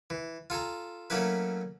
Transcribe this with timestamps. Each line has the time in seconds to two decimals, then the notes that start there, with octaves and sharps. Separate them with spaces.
0.10 E3
0.50 F4 A4 G#5 A#5
1.10 F#3 A3 A#3 C#4 E4 B4